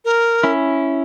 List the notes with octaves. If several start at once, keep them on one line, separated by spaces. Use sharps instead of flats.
A#4
C#4 E4